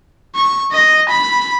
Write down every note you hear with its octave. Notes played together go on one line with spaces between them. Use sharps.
C#6
D#5
B5